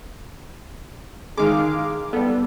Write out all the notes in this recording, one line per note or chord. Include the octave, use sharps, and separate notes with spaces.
D#3 G#3 F5 D6
G3 B3 A4